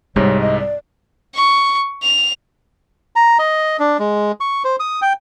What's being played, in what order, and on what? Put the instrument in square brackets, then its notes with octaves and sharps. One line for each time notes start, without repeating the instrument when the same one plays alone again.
[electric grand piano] C2 G#2 C3 [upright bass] G3 C4 [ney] C#5
[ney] D#5
D5
[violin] C#6
F7
[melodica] A#5
D#5
D4
G#3
C#6
C5
D#6
G5